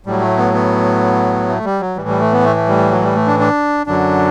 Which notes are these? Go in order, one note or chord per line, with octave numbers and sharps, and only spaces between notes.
A2 F#3 G3
A3
B3
B3
A3
G3
F#3
A2 E3 G3
G3
A3
B3
A3
A3
G3
F#3
G3
A3
D4
D4
F#2 D3 F#3 D4